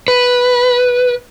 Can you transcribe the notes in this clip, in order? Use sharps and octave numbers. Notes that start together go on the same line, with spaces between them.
B4